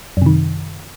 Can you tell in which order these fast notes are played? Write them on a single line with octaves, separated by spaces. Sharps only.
F#2 C3 D#3